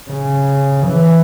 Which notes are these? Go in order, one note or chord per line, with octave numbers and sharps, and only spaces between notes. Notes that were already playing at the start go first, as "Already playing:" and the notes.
C#3
E3